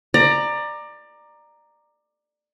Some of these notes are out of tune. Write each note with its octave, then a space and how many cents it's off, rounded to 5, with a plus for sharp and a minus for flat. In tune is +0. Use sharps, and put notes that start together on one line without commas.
D5 +20 A#5 +0